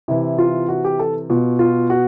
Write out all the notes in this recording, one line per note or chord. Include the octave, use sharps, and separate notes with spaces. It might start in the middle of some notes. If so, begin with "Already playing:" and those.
C3 E3 E4
F4
F#4
G4
A4
B2 F4
F4
F#4